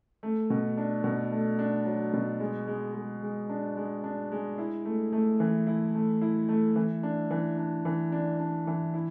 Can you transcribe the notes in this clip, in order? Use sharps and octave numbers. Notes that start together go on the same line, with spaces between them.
A3
B2
D4
B2
A3
D4
F#3
B2
G#3
G#3
G#3
G#3
D4
G#3
D4
G#3
E4
A3
A3
E3
E4
A3
E4
A3
E3
D4
E3
D4
E3
D4
D4
E3
E4